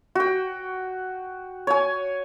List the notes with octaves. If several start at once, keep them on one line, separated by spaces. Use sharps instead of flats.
F#4 G5
C#5 G#5